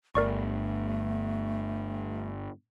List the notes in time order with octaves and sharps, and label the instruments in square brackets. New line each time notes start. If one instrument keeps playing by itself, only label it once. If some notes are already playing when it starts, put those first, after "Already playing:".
[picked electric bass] G1 [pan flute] A3 [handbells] A#4 D5 C#6